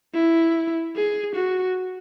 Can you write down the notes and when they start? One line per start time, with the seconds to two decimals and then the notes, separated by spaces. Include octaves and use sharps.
0.14 E4
0.96 G#4
1.36 F#4